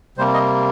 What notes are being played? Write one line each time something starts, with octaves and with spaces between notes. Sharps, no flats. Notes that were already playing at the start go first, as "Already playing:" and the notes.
C3 G3 A#3 C5
D#5